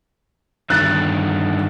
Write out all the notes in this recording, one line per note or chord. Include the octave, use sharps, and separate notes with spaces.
G2 D3 D#3 F#6 A6